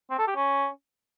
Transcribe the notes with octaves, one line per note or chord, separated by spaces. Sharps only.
C4
A4
G4
C#4